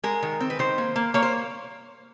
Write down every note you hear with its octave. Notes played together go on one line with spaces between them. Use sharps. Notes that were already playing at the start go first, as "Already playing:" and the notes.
G#3 A#4
D#3
C4
B4
D#3 C5
A#3
A#3
A#3 C#5
C5